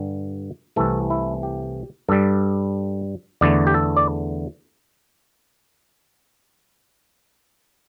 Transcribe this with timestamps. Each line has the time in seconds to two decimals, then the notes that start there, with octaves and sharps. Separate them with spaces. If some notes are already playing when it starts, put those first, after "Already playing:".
Already playing: G2 D3 G3
0.76 C2 C3 E3 A3 A4
1.10 E4
1.43 G4
2.09 G2 G3 A4
3.41 E2 D3 A3 D5
3.67 G4
3.74 A4
3.97 D5